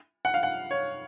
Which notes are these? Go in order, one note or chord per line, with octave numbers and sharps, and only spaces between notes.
F#5
F5
F#5
C#5